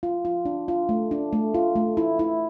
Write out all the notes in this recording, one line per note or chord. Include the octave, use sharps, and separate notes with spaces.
F4
F4
D4
F4
A3
D4
A3
F4
A3
E4
E4